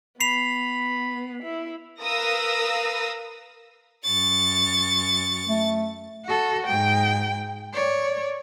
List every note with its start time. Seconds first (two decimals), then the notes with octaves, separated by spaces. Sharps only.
0.20 B3 B5 C7 F7
1.43 E4
2.01 A#4 B4 F5 D#6 E6 A#6
4.05 F#2 C#6 A6
5.48 A3
6.25 F#4 A4
6.67 G#2 G5
7.73 C#5 D5